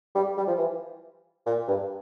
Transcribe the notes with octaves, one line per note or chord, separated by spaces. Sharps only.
G3
G3
F3
E3
A#2
G2